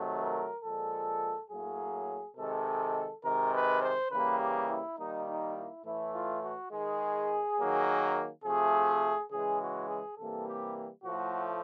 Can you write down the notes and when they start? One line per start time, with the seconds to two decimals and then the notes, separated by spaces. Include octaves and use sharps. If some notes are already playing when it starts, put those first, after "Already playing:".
Already playing: C3 D#3 F#3 A3
0.21 A#4
0.64 A#2 F3 G#3 A4
1.51 A2 F#3 A#3 G#4
2.37 C3 D#3 G#3 A4
3.24 C3 D#3 G#3 A#4
3.54 B4
3.82 C5
4.11 C#3 E3 G3 A#3 B4
4.40 G4
4.69 E4
4.98 D#3 G3 A#3 D#4
5.28 D#4
5.56 E4
5.85 A2 E3 A3 E4
6.14 F4
6.43 F#4
6.71 D#3 G#3 G#4
7.59 D#3 F#3 A#3
8.44 C3 F3 A3 G#4
9.31 C#3 E3 G#3 G#4
9.61 F#4
9.89 G#4
10.18 C3 E3 G3 A#3 A4
10.48 G4
11.05 A2 F3 A3 F#4